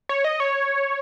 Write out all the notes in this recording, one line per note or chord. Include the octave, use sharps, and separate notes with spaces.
C#5
D#5
C#5